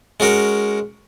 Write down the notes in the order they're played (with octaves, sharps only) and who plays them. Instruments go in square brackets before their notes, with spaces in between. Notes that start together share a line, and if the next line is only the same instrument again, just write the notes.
[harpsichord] G#3 C#4 F#4 A#4